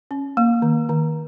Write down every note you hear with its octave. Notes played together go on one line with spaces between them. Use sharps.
C#4
A#3
D#3
D#3